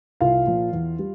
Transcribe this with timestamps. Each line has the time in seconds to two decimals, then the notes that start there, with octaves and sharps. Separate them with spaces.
0.21 C2 F4 F5
0.47 A#2 F3
0.73 E2
0.99 G3